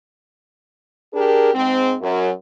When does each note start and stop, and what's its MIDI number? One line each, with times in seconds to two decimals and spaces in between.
1.14 1.54 62
1.14 1.54 67
1.14 1.54 68
1.14 1.54 70
1.54 1.95 44
1.54 1.95 56
1.54 1.95 60
2.01 2.30 42